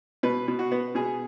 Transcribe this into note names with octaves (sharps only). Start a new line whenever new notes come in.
B2 B4
B2
F#4
B3
B2 G#4